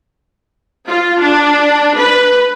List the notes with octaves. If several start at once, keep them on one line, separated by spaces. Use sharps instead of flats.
F4
D4
B4